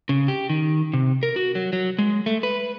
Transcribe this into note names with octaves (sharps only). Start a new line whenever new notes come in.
C#3
G4
D#3
C3
A#4
F#4
F#3
F#3
G#3
A3
B4